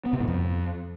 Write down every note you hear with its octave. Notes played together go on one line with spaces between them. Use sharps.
B3
C3
G#2
F2